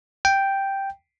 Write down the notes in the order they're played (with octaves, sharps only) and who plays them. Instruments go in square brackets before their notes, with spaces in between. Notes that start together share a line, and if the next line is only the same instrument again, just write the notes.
[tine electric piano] G5